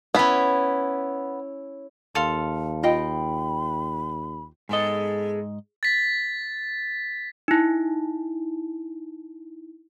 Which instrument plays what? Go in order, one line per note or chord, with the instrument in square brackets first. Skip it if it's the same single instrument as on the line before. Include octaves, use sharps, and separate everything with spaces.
[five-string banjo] B3 B5 [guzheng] C#4 E4
[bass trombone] D#2 [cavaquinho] A4 F5 C6
[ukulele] F4 D#5 G5 [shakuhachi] B5
[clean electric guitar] G#2 D#5 [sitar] G#3 B3 A4
[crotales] A6 B6
[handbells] D#4 E4